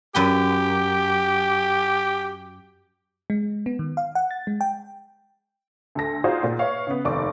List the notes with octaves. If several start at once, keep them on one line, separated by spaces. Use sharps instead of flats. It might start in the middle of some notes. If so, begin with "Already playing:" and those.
F#2 G4 B4 G5
G#3
B3
D#3
F5
F#5
A6
G#3
G5
D2 A4 A#6
D#4 F4 F#4 G#4 C5 D5
A#2
B4 C#5 E5 F5 C#6
C#3 B3
F1 D#2 D5 C#6 D6